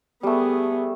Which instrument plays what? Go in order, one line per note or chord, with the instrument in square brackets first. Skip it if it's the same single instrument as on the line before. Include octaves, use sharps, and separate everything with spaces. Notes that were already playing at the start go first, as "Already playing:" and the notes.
[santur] G3 A3 [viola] B3 G#4